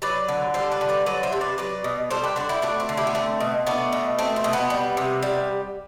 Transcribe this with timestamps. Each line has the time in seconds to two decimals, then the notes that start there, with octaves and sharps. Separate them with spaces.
0.02 F#3 B4 D5
0.29 D3
0.54 G3 A4 C5
0.72 B4 D5
0.81 D3
0.89 B4 D5
1.06 F#3 B4 D5
1.23 C5 E5
1.33 C3
1.41 B4 D5
1.58 F#3 B4 D5
1.84 B2
2.11 G3 A4 C5
2.24 G4 B4
2.36 D3 D4 F#4
2.49 E4 G4
2.62 A3 D4 F#4
2.80 C4
2.89 D3
2.97 E4 G4
3.07 B3
3.15 A3 C4
3.40 B2
3.67 A3 B3 D4
3.93 B2
4.19 A3 C4
4.36 C4
4.44 B2
4.53 B3
4.70 G3
4.97 C3
5.23 G3